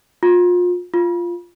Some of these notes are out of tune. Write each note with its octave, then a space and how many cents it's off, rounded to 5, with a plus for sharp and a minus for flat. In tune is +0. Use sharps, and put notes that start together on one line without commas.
F4 +30
F4 -5